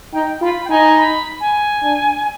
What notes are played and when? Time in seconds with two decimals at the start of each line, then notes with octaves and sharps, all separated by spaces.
0.13 D#4 G5
0.41 F4 B5
0.65 G5
0.69 D#4 G#5
0.98 B5
1.40 G#5
1.82 D4